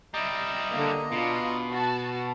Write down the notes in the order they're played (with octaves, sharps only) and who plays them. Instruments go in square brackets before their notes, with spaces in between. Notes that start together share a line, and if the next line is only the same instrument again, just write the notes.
[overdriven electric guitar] G3 E4 [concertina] D#5 A#5
[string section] D3 A#3
[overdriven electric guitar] B2 [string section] D4 F4
[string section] F#4 A5